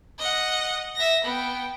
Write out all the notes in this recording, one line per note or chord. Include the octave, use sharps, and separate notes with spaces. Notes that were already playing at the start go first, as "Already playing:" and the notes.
D#5 F#5
E5 A#6
B3 G5